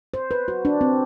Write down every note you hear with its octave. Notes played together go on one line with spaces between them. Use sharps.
C5
B4
F#4
D4
C4